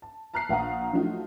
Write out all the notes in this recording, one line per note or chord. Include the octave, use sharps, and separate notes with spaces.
A5
A5 A#5 F6 F#6 B6 C7
A#1 F5 F#5 A#5 D#6
F3 F#3 A3 D#4 F4 F#4